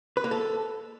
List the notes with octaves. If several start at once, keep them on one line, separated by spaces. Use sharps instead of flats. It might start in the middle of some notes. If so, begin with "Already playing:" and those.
B4
A#3
A4